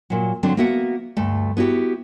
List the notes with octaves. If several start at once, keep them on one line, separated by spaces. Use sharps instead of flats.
A#2 F#3
D3 F#3 C4 D4
A#3 B3 F#4 E5 F#5
D2 G2 A3
B3 E4 F#4 G4